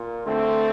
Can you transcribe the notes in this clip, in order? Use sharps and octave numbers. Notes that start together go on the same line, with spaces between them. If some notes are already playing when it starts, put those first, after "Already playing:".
Already playing: A#2
D3 A3 C4